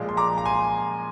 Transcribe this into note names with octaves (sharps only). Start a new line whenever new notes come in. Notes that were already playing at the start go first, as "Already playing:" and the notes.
Already playing: A#2 F3 G#3
C6
A#5 D6
A#5
G#5 C6